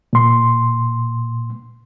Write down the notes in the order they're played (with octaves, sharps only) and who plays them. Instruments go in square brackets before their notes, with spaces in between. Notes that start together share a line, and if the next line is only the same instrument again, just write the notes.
[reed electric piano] A#2 C6